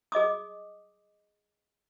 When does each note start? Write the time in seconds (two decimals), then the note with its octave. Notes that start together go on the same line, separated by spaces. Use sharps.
0.12 G#4 D#5 D6 D#6